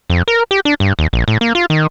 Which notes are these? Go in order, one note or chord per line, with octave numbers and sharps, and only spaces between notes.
F2
A#4
G4
D4
G2
D#2
A#1
A2
A#3
F4
D#3